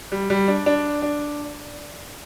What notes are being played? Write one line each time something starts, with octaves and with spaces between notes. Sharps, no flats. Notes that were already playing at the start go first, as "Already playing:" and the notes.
G3
G3
D4
D4
D4